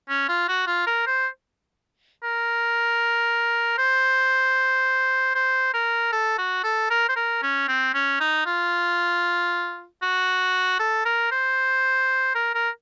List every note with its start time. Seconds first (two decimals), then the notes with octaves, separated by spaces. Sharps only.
0.09 C#4
0.29 F4
0.48 F#4
0.67 F4
0.87 A#4
1.07 C5
2.23 A#4
3.79 C5
5.35 C5
5.74 A#4
6.13 A4
6.38 F#4
6.64 A4
6.90 A#4
7.09 C5
7.16 A#4
7.43 C#4
7.68 C4
7.94 C#4
8.20 D#4
8.46 F4
10.02 F#4
10.79 A4
11.05 A#4
11.32 C5
12.35 A#4
12.55 A#4